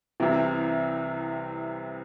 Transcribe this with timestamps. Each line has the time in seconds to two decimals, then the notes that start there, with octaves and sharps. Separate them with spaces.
0.20 C2 C3 E3